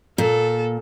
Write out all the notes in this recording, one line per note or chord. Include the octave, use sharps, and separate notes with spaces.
A#2 A4